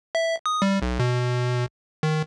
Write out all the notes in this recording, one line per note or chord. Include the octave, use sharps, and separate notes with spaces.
E5
D#6
G3
B1
B2
D#3